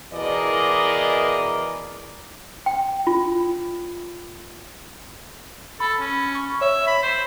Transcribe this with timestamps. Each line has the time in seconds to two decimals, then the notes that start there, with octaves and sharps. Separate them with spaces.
0.13 B2 E3 G#4 A#4 D5 D#5
2.66 G5
3.07 F4
5.80 A4 B5
6.00 C#4
6.35 C#6
6.61 C#5 E5
6.87 B5
7.03 C5